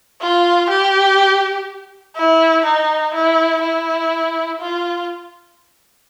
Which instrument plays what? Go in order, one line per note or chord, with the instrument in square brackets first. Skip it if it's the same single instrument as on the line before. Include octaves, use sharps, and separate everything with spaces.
[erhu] F4
G4
E4
D#4
E4
E4
F4